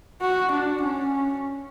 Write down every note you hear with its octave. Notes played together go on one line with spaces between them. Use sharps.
F#4
D4
C#4